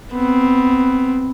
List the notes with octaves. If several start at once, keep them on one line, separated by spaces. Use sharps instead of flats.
B3 C4